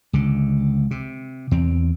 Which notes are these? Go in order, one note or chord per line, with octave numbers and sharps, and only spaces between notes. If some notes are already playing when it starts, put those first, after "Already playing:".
C#2 D3
C3
E2 C4